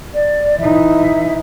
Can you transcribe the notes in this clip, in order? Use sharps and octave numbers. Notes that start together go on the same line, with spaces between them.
D5
E3 D#4 E5